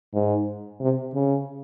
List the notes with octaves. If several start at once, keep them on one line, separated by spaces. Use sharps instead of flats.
G#2
C3
C#3